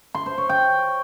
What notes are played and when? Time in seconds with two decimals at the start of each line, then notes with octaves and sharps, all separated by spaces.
0.15 C6
0.26 C5
0.38 C#5
0.49 G5